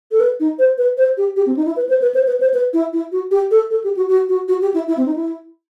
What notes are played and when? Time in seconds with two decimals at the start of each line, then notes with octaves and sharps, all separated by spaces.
0.12 A4
0.20 B4
0.40 D#4
0.59 C5
0.78 B4
0.98 C5
1.17 G4
1.36 G4
1.46 C4
1.57 D#4
1.66 E4
1.76 B4
1.89 C5
2.02 B4
2.15 C5
2.27 B4
2.40 C5
2.54 B4
2.73 E4
2.93 E4
3.12 F#4
3.31 G4
3.51 A4
3.70 A4
3.84 G4
3.97 F#4
4.09 F#4
4.29 F#4
4.48 F#4
4.62 G4
4.74 E4
4.88 E4
4.97 C4
5.06 D#4
5.16 E4